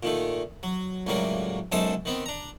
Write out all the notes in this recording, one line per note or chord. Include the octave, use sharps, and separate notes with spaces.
A#2 D#3 A3
F#3
C#2 A2 F#3 G3 A#3
B1 F#2 G#3 A4 C5 A5
D#3 B3 C4
D4 A#5